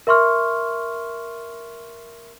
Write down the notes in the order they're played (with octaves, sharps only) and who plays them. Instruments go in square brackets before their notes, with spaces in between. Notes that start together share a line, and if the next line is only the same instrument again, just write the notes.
[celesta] A#4 E5 C6 C#6 F6